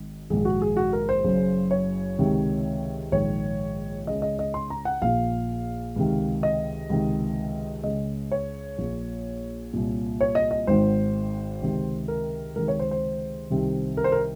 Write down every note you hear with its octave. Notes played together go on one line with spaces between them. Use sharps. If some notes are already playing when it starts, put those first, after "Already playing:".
Already playing: G#1 G#2 D#3
A#1 G#2 D#3 G#4
F#4
G#4
F#4
A#4
C5
F#1 F#2 C#3
C#5
C#2 C3 D#3
A#1 G#2 D#3 C#5
C#2 C#3 D#5
D#5
D#5
C6
A#5
F#5
A#1 A#2 F5
C#2 C3 D#3
D#5
C#2 C3 D#3
C#2 C#3 D#5
C#5
A#1 A#2
C2 A#2
C#5
D#5
D#5
G#1 G#2 D#3 C5
C#2 C3 D#3
A#4
C#2 C3 D#3 A#4
C#5
C5
C5
C2 C3 D#3
A#4
C5
A#4